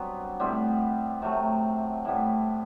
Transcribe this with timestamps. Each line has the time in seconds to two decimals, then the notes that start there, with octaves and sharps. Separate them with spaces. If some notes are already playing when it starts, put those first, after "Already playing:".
Already playing: G2 F#3 B3 C4
0.40 A2 G3 B3 C4
1.22 C3 F#3 A3
2.05 A2 G3 B3